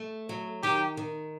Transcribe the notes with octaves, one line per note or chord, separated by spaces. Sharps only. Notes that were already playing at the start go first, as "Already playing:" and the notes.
Already playing: A3
F#3
D#3 G4
D#3